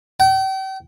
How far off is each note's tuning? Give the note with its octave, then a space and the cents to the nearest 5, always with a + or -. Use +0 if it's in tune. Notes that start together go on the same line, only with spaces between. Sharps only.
G5 -35